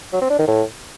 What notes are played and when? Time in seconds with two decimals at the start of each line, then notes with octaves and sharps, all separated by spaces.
0.13 F#3
0.21 C4
0.30 D4
0.39 D#3
0.47 A2